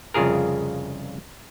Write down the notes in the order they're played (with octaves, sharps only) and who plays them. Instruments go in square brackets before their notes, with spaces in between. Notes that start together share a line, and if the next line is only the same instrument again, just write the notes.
[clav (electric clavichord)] C2 F2 C#3 F4 G#4 A#4